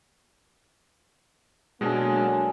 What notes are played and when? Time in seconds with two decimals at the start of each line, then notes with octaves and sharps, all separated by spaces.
1.81 B2 F#3 G#3 A#3 D4 G#4 A4